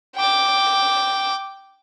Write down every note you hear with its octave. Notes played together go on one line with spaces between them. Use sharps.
G5 D6